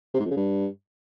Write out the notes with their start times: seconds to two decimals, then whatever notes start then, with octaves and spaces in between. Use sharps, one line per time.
0.14 C3
0.20 G#2
0.25 F2
0.31 C#3
0.36 G2